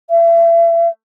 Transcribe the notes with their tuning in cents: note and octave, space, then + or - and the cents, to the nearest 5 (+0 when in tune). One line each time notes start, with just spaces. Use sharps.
E5 +35